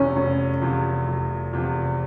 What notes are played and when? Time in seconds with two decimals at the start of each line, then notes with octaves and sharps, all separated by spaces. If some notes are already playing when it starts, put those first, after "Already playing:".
Already playing: F1 E2 C3 F3 C#4
0.16 F1
0.62 E2 C3 F3
1.08 F1
1.53 E2 C3 F3